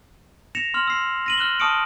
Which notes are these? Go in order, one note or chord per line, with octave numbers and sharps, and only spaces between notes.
A#6 C#7 E7 F7
C6 F6 F#7
E6 C7
A#6 D#7 F#7
F6 F#6 E7 G7
A5 C#6 D#6 F6 C#7 D7